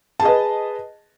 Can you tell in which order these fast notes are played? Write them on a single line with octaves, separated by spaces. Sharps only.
A5 G#4 D#5 B4